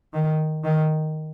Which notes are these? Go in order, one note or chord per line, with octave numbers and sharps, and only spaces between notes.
D#3
D#3